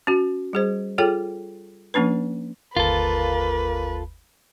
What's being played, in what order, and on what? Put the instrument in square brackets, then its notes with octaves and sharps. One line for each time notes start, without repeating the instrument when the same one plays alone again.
[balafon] C#4 F#4
G3 G#4 C5
F4 G#4 A4 C#5 G5
F3 A#3 C#4 D4 B4
[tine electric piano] G1 D#2 [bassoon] A#3 [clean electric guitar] F4 A4 [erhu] B4